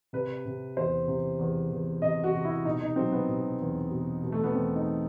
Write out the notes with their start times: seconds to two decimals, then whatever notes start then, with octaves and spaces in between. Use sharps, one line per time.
0.13 C3 B4
0.46 C3
0.77 E2 C5
1.08 C3
1.39 E2
1.71 E2
2.02 C3 D#5
2.24 F#4
2.34 C3
2.45 E4
2.65 B2 D#4
2.81 D#4
2.96 F#3 C4
3.12 B3
3.28 B2
3.60 E2
3.91 B2
4.23 B2
4.32 A3
4.44 B3
4.54 E2 C4
4.75 D#4